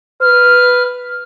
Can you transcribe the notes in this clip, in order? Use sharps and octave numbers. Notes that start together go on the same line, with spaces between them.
B4 F6